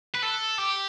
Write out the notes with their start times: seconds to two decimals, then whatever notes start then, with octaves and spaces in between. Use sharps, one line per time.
0.14 B4
0.22 A4
0.58 G4